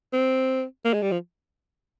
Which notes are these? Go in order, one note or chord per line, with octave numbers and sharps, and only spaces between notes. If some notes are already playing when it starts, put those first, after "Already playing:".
C4
A#3
G#3
G3
F3